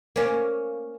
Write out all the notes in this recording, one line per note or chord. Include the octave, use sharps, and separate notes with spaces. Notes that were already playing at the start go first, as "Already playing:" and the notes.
A#3 C#4